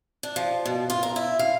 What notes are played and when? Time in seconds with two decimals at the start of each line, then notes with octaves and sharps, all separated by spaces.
0.23 D4
0.36 F3
0.66 B2
0.90 F4
1.03 A#4
1.16 E4
1.39 F5